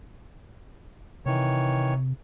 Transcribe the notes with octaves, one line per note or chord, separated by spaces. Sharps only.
C3 D#3 E3 C#5